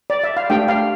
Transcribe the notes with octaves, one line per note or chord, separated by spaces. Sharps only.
D5
E5
F5
A3 D4 G4 G5
F5